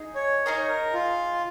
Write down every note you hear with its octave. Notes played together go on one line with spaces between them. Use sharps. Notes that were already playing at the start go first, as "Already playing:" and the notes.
Already playing: D#4 G#4 D#5
C#5
D#4 G#4 A#4 D#5
C#5
A#4
F4